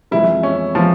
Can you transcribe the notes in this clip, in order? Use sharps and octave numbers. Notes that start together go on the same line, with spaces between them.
F2 E3 G#3 E4
C#4
E3 F3 G#3